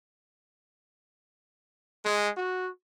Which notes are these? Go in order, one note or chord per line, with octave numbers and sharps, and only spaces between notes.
G#3
F#4